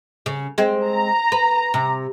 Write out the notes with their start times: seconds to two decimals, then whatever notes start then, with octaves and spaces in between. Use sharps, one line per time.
0.26 C#3
0.58 G#3 C4
0.88 A#5
1.32 B4
1.74 C3